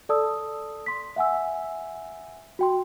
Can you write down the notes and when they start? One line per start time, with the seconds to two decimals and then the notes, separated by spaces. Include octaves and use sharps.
0.09 A4 D5 A5 D#6 E6
0.86 C6 B6
1.16 E5 F#5 G#5 E6
2.59 F#4 G5 C6